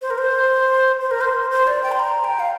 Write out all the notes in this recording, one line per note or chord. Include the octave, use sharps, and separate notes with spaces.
C5
A#4
C5
C5
A#4
C5
C5
D5
G5
C6
A#5
G5
F5